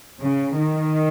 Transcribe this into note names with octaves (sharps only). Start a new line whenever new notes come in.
C#3
D#3